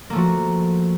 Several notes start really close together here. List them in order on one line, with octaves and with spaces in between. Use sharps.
A#3 A3 F3 F#4